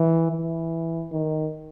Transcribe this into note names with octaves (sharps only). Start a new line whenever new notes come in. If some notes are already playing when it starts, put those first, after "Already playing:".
Already playing: E3
E3
D#3